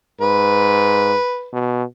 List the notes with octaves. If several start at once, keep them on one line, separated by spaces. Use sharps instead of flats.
G#2 B4
B2